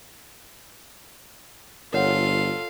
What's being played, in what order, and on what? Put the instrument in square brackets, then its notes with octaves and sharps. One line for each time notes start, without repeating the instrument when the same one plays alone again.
[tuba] G1 [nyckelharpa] F4 A4 [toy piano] A#4 C#5 F#5 [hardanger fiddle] F5